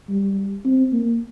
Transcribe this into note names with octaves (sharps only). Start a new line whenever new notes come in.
G3
C4
A#3